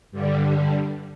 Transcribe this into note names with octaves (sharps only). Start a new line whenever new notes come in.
G2 D3 G3